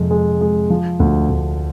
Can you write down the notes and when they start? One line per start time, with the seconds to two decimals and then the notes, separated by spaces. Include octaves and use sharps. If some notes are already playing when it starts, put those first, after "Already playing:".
Already playing: F2 C3 G#3
0.11 G#3
0.41 G#3
0.70 F3
1.00 D2
1.30 D2